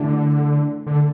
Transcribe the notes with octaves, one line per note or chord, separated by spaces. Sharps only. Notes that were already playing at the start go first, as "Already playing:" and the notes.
Already playing: D3 E3 A3 D4 G4
D3